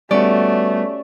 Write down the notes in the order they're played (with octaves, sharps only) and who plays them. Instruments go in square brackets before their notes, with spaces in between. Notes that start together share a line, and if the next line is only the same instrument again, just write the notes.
[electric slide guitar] G3 B3 F#4 [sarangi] A3 [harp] C#4 D5